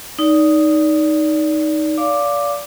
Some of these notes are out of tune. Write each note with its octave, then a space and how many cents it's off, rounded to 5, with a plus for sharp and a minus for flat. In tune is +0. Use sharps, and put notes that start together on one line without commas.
D#4 +0 D5 -25
D5 -30 F5 +0 D6 +5